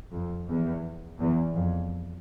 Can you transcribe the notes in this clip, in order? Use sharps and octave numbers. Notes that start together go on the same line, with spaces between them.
F2
E2
E2
F2